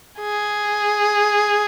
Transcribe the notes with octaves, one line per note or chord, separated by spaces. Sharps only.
G#4